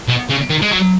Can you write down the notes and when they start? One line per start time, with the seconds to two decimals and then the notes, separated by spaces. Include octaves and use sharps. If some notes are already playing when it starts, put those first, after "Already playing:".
0.08 B2
0.30 C#3
0.50 D#3
0.62 G#3
0.71 F#3